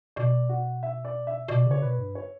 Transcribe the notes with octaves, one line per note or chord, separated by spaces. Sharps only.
B2 D5
F#4
E5
D5
E5
B2 D5
C#3 C#5
B2 B4
G2
C#5